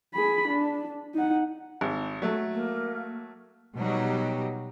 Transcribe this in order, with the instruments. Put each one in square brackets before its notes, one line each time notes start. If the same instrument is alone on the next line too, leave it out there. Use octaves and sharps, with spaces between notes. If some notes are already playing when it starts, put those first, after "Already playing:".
[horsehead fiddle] G#4 B5
D4
D#4 F#5
[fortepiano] G#1
F#3 A3
[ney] A#3
[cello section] B2 F#3 G3 D#4 G4